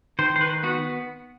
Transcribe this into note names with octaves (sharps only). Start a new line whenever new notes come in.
D#3 C5
C5
D#3 B4
B3 F#4